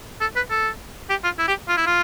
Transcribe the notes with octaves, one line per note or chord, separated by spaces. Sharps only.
A4
B4
A4
G4
F4
E4
G4
F4
E4
F4